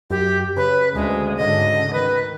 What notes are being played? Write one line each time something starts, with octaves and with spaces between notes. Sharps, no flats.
F#2 G4
C#3 B4
D2 G#3
D2 G#2 D3 D#5
D#3 B4